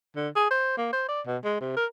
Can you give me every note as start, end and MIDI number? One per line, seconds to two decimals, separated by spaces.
0.16 0.29 50
0.36 0.51 68
0.51 0.76 72
0.78 0.90 58
0.93 1.05 72
1.08 1.21 74
1.26 1.37 47
1.44 1.59 56
1.61 1.73 48
1.76 1.86 70